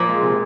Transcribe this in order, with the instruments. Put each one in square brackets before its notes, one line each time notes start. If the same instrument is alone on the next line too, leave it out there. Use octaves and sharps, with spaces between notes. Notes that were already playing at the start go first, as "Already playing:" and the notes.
Already playing: [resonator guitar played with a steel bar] A#2 [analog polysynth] F3
[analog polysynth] G#3
C3